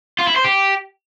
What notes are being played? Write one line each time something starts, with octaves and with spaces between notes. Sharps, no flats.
F4
E4
C5
G4